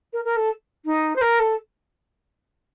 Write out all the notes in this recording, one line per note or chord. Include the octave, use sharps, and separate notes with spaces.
A#4
A#4
A4
D#4
C5
A#4
A4